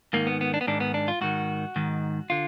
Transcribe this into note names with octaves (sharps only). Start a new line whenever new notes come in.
G#2 D#3 A#3
B3
B3
D4
B3
G#2 D#3 D4
B3
D4
F4
G#2 D#3 F#4
G#2 D#3
D3 F4